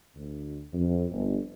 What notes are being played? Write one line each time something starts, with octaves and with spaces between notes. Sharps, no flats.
D2
F2
G1